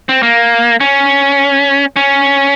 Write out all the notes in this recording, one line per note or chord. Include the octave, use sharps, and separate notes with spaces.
C4
A#3
C#4
C#4